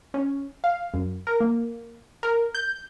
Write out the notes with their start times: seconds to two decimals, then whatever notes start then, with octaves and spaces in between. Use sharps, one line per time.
0.14 C#4
0.64 F5
0.94 F#2
1.27 A#4
1.40 A#3
2.23 A#4
2.55 G6